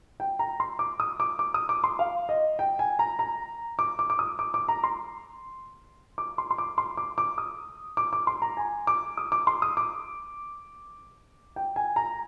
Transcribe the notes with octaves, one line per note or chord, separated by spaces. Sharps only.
G5
A#5
C6
D6
D#6
D6
D6
D#6
D6
C6
F5
D#5
G5
G#5
A#5
A#5
D6
D6
D6
D#6
D6
D6
A#5
C6
D6
C6
C6
D6
C6
D6
D6
D#6
D6
D6
C6
A#5
G#5
D6
D#6
D6
C6
D#6
D6
G5
G#5
A#5